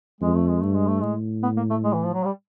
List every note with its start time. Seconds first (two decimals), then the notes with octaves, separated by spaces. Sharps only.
0.21 F2 G#3
0.35 A3
0.47 G#3
0.61 G2 A3
0.74 G#3
0.87 A3
1.01 A2 G#3
1.43 B3
1.57 A#3
1.70 A3
1.84 G#3
1.94 E3
2.05 F3
2.14 F#3
2.25 G3